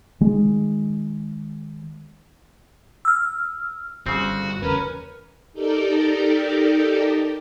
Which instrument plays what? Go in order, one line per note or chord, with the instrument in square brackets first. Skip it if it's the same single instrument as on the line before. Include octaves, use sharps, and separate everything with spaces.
[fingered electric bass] D#3 G#3
[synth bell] E6 F6
[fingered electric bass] G1 G3 [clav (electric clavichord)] C#3 C4 [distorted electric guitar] F#4
[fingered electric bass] E2 C#3 [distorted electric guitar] C#4 [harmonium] A#4 B4
[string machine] D#4 G4 A4 A#4 D5 G5